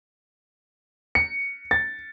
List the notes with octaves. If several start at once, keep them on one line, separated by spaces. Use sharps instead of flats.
C#7
A6